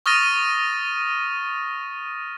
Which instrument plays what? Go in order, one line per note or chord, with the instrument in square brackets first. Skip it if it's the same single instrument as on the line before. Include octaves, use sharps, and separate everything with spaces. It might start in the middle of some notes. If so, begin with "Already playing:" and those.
[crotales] C#6 D#6 F6 A6 A#6 D#7